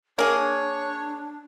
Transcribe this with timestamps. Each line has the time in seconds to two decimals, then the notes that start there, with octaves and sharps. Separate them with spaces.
0.19 A#3 D4 G#4 C#5